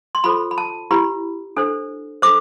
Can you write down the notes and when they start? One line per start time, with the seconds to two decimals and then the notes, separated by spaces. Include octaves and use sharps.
0.15 C6
0.24 F4 A4 C5 B5
0.51 B5
0.58 A5
0.91 E4 G4 B4 B5
1.57 D4 A4 C5
2.22 D4 A4 C5 D6